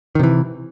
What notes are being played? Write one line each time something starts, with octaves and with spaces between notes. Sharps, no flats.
C3 D#3 E3